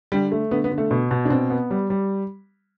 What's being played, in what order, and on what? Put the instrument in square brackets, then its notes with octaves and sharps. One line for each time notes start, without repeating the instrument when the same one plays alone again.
[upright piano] D3 [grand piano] G3
[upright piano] A3
[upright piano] D3 [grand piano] B3
[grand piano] B3
[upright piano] D3
[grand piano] A3
[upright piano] B2
B2
[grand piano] D4
[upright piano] B2 [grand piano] C4
[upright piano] B3
G3
G3